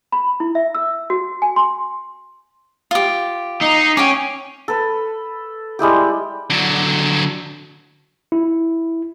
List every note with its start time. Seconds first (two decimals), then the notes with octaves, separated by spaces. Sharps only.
0.12 B5
0.40 E4
0.55 E5
0.75 E6
1.10 F#4
1.42 G#5
1.56 C6
2.91 F4 G4
3.61 D#4 C7
3.97 C#4 G5 G#5 D6
4.68 A4 B4
5.79 G3 G#3 E4 G4
6.50 D3 F#3
8.32 E4